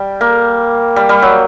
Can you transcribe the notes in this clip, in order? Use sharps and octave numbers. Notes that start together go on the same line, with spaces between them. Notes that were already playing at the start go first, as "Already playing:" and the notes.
Already playing: G3
A#3
G3
G3
F#3